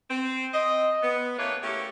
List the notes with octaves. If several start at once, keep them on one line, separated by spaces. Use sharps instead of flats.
C4
C4 D#5
B3
C#3 A3 A#3 E4 B4 C#5
A3 A#3 C#4 E4 G4